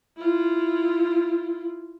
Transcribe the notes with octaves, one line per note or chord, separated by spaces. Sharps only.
E4 F4